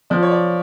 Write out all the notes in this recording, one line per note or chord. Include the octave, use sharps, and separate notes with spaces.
F3 D5
C#5
D5